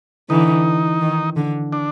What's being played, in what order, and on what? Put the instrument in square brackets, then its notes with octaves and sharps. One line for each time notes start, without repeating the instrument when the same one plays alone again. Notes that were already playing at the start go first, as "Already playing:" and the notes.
[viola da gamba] D3 E3 [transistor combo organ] D#4
[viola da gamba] D#3
D3
[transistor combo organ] D4